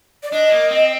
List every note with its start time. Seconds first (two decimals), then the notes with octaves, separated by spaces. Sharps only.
0.23 D5
0.32 D4 D#5
0.50 A#3
0.69 C4